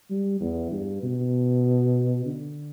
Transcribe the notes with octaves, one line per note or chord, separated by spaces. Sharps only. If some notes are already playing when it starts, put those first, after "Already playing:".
G3
E2
G2
B2
D3